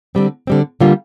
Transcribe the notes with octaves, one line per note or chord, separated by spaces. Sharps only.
D3 G3 C4
D3 G3 C4
D3 G3 A#3 F4